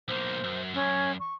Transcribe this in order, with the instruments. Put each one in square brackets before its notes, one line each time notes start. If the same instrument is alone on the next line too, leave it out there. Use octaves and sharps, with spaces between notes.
[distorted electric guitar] B1 A#3 [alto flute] C5
[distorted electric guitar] F#2
[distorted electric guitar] F#2 [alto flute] C#4
[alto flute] C#6